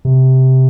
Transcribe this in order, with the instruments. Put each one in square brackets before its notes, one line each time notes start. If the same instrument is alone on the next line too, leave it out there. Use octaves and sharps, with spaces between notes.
[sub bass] C3